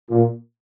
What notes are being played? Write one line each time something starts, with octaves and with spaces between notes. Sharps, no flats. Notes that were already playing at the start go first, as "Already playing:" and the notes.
A#2